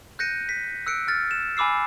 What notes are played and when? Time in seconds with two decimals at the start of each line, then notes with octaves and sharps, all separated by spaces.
0.19 F#6 G6 A#6 C#7 D#7
0.49 B6
0.86 E6 F#6 C#7 D7
1.08 F6 A6
1.31 E7
1.57 G#5 B5 D6 E6 C7